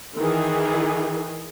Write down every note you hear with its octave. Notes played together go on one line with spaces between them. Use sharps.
D#3 E3 G#4